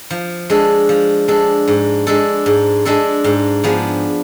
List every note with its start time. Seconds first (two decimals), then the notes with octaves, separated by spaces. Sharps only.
0.11 F3
0.50 G#3 D4 A4
0.89 F3
1.28 G#3 D4 A4
1.68 G#2
2.07 G#3 D4 A4
2.46 G#2
2.85 G#3 D4 A4
3.24 G#2
3.64 F3 B3 D4 G#4